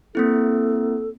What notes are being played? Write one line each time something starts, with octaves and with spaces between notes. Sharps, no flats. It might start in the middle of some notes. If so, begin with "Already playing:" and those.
A#3 C4 E4 A4